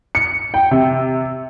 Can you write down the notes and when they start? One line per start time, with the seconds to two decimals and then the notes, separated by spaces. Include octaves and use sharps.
0.15 C#7
0.54 G5
0.71 C3